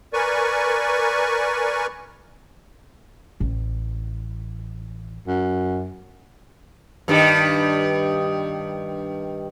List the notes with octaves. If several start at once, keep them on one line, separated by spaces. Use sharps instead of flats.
A#4 B4 D5 G#5 C#6
A1
F#2
G2 D#3 G3